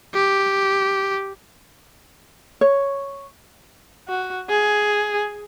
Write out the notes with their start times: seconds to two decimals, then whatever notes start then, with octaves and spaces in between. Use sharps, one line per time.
0.15 G4
2.61 C#5
4.08 F#4
4.49 G#4